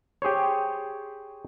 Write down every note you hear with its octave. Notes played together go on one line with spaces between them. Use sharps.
G4 G#4 C5 C#5